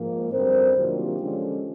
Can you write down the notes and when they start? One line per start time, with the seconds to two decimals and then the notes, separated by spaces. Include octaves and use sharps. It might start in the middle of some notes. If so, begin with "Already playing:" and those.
Already playing: G#2 F3 A#3
0.31 F#2 D3 G3 C4 A#4 C5
0.75 C3 D#3 F#3 A#3 D4 F4 G4
1.19 D3 F3 G#3 C#4